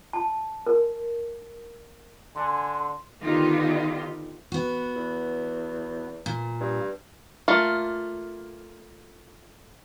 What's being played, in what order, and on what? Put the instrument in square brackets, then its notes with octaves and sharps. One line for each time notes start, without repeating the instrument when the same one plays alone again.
[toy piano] A5
A#4
[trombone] D3 [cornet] G#5 [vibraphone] C6
[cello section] D3 D#3 B3 D#4 F4 G4
[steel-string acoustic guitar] B3 F#4
[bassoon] E2
[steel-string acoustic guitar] A#2
[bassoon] G2
[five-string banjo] A3 A#3 F4